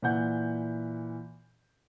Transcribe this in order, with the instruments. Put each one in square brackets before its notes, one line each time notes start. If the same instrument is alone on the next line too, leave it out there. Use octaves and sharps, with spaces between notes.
[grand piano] A#2 E3 F#5 G6